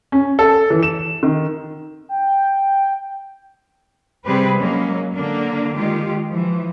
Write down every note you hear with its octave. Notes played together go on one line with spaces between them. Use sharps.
C#4
A4
E3
E7
D#3
G5
C3 G3 C4 G4 G#4 B4
F#3 G#3 A#3 C#4
D3 A#3 D4
D#3 G#3 F4 G4
E3 F3